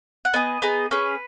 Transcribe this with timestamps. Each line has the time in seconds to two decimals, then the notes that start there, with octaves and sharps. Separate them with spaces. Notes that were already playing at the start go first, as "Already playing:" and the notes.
0.25 F#5
0.34 B3 G#4 D#5
0.62 B3 D#4 G#4
0.91 C#4 G#4 B4